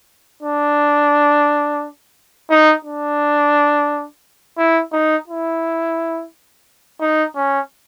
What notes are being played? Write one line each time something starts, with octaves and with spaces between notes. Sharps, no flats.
D4
D#4
D4
E4
D#4
E4
D#4
C#4